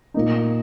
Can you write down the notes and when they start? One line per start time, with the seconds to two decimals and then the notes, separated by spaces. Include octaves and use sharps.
0.14 A#2 A#3 D#4